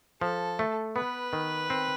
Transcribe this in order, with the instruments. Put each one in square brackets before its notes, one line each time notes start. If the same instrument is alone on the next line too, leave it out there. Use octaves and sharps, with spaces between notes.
[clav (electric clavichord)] F3 [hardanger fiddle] A4
[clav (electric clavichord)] A3
[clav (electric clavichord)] B3 [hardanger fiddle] B4
[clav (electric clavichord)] D#3
C4